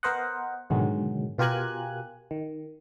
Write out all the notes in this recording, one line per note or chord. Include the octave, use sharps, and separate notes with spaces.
B3 A#4 C5 D#5 F#5
G#2 B2 D3 D#3 F#3 G#3
B2 F4 G4 A#4 G#5 F#6
D#3